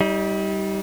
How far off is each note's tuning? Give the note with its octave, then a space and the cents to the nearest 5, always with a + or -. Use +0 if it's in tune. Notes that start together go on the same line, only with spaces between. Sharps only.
G3 -10 D#4 +35